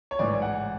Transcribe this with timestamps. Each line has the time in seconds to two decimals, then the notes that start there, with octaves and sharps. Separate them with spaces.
0.11 C#5
0.19 A1 G#2 E3 D5
0.42 F#5